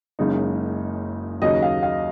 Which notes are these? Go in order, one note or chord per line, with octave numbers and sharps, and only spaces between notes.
F#1 F#2 C#3 G#3 D#4
D#2 C#3 F#3 D#5
F5
F5